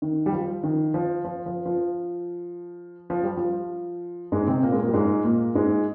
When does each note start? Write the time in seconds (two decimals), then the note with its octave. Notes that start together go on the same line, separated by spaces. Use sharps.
0.02 D#3
0.26 G3
0.32 F3
0.63 D#3
0.94 F3
1.25 F3
1.46 F3
1.66 F3
3.10 F3
3.23 G3
3.37 F3
4.32 G#2 G#3
4.47 C3 C4
4.63 A#2 A#3
4.72 G#3
4.78 A#2 A#3
4.88 G3
4.94 G#2 G#3
5.24 A#2 A#3
5.55 G#2 G#3